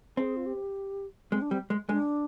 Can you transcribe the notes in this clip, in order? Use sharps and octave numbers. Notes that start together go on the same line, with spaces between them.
C4 G#4
F4
G4
G#3 C4
D4
G3 C4
G#3
G#3 D4